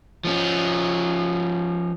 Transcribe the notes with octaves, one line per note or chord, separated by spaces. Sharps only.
F3 C#4